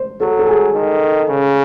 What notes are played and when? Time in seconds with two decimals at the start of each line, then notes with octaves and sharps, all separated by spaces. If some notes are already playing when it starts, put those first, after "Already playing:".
Already playing: C5
0.20 F#3 A4
0.39 A4
0.47 G#4
0.74 D#3
1.29 C#3